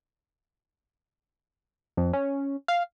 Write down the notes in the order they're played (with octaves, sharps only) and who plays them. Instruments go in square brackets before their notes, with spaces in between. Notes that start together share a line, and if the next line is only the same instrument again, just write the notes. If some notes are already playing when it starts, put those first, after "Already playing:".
[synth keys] F2
C#4
F5